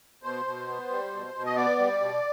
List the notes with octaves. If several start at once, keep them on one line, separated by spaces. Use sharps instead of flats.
B2 C5
B2
B3
G3
B2
B2
D#5
B3 D5
G3
B2